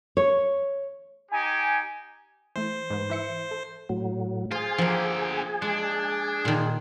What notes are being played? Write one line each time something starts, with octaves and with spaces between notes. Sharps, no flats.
C#5
D#4 G4 G#5
E3 A3 C5
G#2 B4
E3 E5 C#7
A4
A2 F#3
F4 G#4 C5
D3 F3 A#3 G4
G#3 D4
A#2 D#3